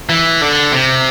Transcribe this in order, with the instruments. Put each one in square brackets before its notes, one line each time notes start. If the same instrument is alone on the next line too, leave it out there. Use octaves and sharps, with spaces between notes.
[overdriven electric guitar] E3
D3
C3